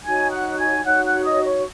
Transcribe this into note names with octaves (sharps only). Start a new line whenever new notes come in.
D#4 F#4 C#5 G#5 G#6
F#5 F#6
G#5 G#6
D#4 F#4 C#5 F#5 F#6
F#5 F#6
D#5 D#6
C#5 C#6